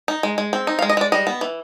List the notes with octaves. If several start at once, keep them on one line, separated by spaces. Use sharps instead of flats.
D#4
G#3
G#3
C4
D#4
F5
G#3
D#5
G#3 D5
G3 D#5
B3
E3